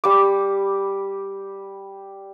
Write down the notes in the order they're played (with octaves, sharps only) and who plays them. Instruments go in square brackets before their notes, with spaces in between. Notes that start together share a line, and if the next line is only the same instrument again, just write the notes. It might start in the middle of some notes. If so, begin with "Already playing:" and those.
[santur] G3 D6